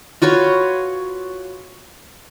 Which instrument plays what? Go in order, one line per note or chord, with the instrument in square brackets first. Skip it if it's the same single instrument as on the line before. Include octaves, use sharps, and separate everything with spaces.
[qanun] F4 F#4 B4 C#5